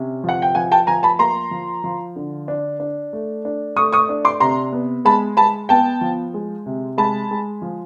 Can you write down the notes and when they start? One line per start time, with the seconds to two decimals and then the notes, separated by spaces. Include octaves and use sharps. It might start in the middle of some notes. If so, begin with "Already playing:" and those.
Already playing: C3 C#4
0.24 F3 F#5
0.42 G5
0.55 F3 F#5 G#5
0.72 G5 A5
0.87 F3 G#5 A#5
1.03 A5 B5
1.19 A#3 A#5 C6
1.51 F3
1.84 F3
2.16 D3
2.48 D4
2.80 D4
3.13 A3
3.45 D4
3.76 A3 C#6 D#6
3.93 C#6 D#6
4.09 D4
4.25 C6 D6
4.40 C3 A#5 C6
4.73 B3
5.05 G#3 A5 B5
5.37 G#3 A5 B5
5.69 B3 G5 A5
6.01 F3
6.34 G#3
6.66 C3
6.98 G#3 A5 B5
7.31 G#3
7.62 F3